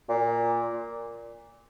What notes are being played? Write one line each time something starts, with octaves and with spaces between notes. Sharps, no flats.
A#2